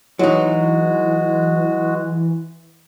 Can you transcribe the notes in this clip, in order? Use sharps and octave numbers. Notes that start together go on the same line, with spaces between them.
E3 F#3 G#3 D#4 F#4